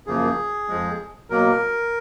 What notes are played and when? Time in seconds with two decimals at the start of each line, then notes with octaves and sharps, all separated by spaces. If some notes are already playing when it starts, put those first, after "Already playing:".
0.06 F#2 C#3 F3 A#3 G#4
0.68 F2 F3 G#3
1.30 B2 F#3 A#3 A#4